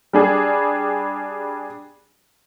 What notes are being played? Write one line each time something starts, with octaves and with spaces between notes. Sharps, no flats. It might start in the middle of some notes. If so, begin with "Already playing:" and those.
G3 D4 G#4